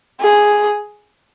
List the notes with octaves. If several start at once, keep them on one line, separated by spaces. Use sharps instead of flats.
G#4